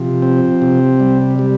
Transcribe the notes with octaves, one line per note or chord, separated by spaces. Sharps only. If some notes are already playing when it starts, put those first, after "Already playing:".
Already playing: C3 F3
C4
C3
G3
G3